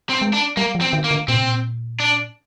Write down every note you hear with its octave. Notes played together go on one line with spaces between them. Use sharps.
C4
G#3
D4
G3 A#3
F3
C4
D#3
A#3
D3
A#2 C4
C3
A#2
D4